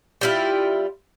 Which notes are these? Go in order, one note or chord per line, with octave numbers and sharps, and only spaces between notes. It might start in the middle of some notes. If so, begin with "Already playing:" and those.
G3 E4 F4